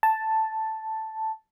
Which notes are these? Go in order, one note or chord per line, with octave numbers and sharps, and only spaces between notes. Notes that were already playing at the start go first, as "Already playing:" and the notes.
A5